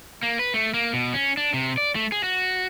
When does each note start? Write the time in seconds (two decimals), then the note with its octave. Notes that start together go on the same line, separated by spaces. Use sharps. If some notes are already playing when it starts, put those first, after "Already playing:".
0.23 A#3
0.39 B4
0.54 A3
0.74 A#3
0.93 B2
1.14 C#4
1.37 D4
1.54 C3
1.78 D5
1.95 A3
2.12 G#4
2.24 F#4